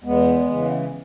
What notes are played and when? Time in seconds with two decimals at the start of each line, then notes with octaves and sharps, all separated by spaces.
0.04 E2 G#3 B3
0.50 C#3 E3